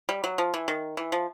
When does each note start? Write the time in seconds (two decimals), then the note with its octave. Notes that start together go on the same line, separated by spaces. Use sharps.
0.09 G3
0.24 F#3
0.38 F3
0.54 E3
0.68 D#3
0.97 E3
1.12 F3